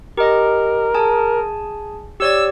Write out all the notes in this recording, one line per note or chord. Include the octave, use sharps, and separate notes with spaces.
G4 A#4 D#5
G#4 G#5 A5
G4 C#5 D5 E6